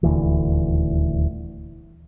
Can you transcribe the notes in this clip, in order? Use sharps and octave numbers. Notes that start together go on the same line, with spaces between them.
D#1 D2 E3